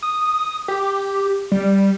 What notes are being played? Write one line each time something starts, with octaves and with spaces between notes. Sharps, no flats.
D#6
G4
G3